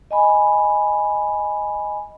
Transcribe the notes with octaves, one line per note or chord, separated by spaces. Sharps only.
D#5 G#5 B5